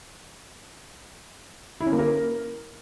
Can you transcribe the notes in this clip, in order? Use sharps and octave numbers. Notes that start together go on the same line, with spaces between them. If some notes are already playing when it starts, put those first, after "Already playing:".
E4
C#4
A#3
A#4